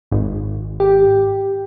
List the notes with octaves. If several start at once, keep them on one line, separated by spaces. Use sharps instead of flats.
G#1
G4